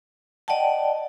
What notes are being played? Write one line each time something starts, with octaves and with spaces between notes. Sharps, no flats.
D5 D#5 F#5 G5 A5